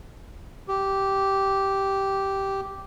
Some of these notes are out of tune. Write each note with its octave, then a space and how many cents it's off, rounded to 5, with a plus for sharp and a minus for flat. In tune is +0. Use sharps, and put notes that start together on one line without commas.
G4 -10